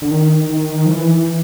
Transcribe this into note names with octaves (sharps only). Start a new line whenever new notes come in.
D3
D#3
D#3
F3
E3